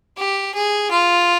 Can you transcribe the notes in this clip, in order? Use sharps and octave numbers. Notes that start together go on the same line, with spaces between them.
G4
G#4
F4